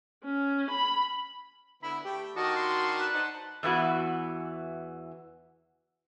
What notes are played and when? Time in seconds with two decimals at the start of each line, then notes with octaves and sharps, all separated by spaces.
0.24 C#4
0.71 B5
1.83 D3 B3 E4 B5
2.04 A3 G4 G5
2.36 D#3 D4 F#4 D#5 A5
2.56 C6
2.99 B4
3.13 D#4 C5 F#5 A5
3.63 E2 E3 B3 F#4